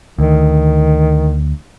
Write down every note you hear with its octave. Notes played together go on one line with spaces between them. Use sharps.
D2 D#3